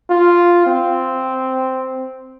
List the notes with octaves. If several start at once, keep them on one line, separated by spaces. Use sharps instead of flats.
F4
C4